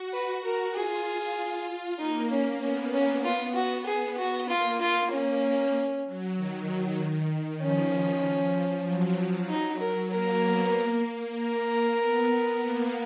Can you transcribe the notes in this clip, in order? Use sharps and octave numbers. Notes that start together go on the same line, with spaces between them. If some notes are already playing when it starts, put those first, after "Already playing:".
Already playing: F#4
B4
A#4
F4 G#4
A#3 D#4
C#4
B3 C#4
C#4
B3 F4
F#4
G#4
F#4
A#3 F4
F4
C#4
F#3
D#3
F3 C#4
F#3
D#4
A#4
A#3 A#4
B3
A#3
A#4
B3
B3
A#3